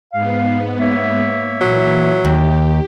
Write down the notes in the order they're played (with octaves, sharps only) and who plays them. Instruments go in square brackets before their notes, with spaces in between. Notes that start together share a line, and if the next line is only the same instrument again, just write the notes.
[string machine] G#2 B3 [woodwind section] F5
[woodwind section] A#3 C#5 E5
[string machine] A#2 E3 [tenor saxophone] F#3
[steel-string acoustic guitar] D#2 [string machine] G4